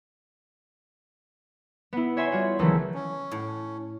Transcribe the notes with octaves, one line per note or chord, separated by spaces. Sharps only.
B3 E4
C#5 E5 G#5 C6
G3 F4 F#4
C#2 D#3 E3 F#3 A3 C#4
C#4
A2